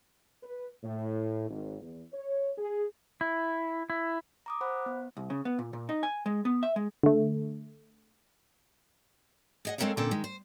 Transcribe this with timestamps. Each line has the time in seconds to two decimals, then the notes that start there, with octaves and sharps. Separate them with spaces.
0.43 B4
0.83 A2
1.49 G#1
1.80 E2
2.13 C#5
2.57 G#4
3.21 E4
3.90 E4
4.46 A#5 D6 D#6
4.61 C5 F#5 B5 F#6
4.86 B3
5.17 C2
5.30 C#3
5.45 B3
5.59 A#2
5.73 A#2
5.89 D#4
6.03 G#5
6.26 G#3
6.45 B3
6.63 E5
6.76 G#3
7.03 D3 A3
9.65 G#4 D#5 F#5
9.78 G#3 C4 A4 A#4 C#5 F5
9.97 A#2 D3 C4 C#4 A4 G5
10.11 D#3 G#3
10.24 C5